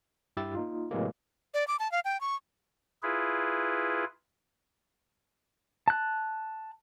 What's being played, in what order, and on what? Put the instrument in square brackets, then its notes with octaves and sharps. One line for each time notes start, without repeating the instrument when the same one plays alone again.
[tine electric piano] G2 E4 G4 E6 A6
A#3 D#4 F4
A2 C3 E3 F#3 G#3 A#3
[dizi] D5
D6
A5
F5
G5
C#6
[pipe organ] E4 F4 G#4 B4
[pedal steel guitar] A5 F#6